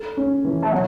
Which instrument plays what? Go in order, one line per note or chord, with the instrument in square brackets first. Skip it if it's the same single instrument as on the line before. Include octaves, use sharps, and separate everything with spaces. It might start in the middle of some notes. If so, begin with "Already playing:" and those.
Already playing: [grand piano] A4
C#4
E3
[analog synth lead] A3
[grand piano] B2 [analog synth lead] F#3